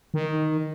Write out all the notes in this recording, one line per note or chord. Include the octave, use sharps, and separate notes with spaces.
D#3